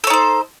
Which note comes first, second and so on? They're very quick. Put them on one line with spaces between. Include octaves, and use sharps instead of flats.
A4 C#5 D#4 C5